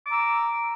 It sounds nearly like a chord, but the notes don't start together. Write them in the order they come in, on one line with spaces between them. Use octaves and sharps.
D6 A#5 E6